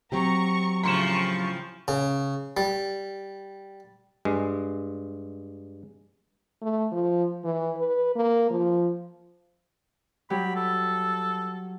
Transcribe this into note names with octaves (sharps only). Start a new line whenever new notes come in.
F#3 C4 G4 A#5 C#6
A2 C#3 F3 A#5 C6 C#6 E7
C#3
G3
G2 G#3
A3
F3
E3
B4
A#3
F3
F#3 G3 G4 B5
A4